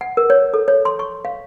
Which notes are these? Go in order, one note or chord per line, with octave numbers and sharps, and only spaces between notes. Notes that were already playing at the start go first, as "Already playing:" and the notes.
F#5
A#4
C#5
A4
C#5
C6
C#6
F5